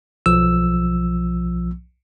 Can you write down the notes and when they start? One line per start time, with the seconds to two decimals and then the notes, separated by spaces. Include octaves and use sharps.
0.26 B1 F3 E6